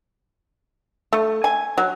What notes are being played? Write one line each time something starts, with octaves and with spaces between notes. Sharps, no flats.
A3
G#5
F#3